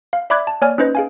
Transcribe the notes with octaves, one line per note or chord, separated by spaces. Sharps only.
F5
D5 E5 B5 D6 F#6 G#6
A5
A#3 C#5 D5 G#5 F6
C#4 D#4 B4 C5 D#5
G#4 F5 G#5